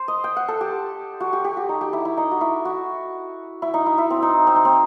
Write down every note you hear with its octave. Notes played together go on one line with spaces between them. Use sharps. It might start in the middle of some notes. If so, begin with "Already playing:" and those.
Already playing: C5
D#5
G5
F#5
A4
G4
F#4
G4
G4
F#4
D#4
G4
E4
E4
D#4
F#4
E4
F#4
E4
D#4
E4
E4
C4
D#4
C4
D#4
C4